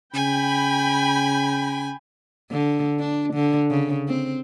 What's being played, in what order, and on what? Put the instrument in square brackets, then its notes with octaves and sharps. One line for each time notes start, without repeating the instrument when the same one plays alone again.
[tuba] C#3 [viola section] G5 B5 [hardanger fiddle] G#5
[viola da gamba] D3
D4
D3
C#3
C4